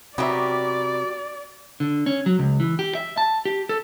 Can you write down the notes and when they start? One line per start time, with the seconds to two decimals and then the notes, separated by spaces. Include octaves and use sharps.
0.18 C3 F#3 B3 F#4 G4 A#4 D5 E5
1.80 D3
2.06 C#4
2.26 F#3
2.39 C#2
2.60 E3
2.79 G4
2.95 E5
3.17 A5
3.45 G4
3.69 A4